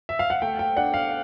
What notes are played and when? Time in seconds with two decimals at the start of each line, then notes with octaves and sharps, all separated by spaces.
0.09 E5
0.19 F5
0.30 F#5
0.42 A3 G5
0.59 G5
0.76 D4 F#5
0.94 F5